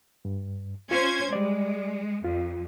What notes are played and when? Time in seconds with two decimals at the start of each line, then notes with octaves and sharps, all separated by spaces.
0.25 G2
0.91 C#4 F4 C5 G#6
1.33 G3 G#3 D5
2.24 F2 F4